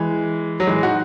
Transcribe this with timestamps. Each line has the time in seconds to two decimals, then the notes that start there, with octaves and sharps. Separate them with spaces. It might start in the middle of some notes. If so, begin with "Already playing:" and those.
Already playing: E3 G#3
0.60 F#3
0.67 E3 G#3
0.83 D#4 F#4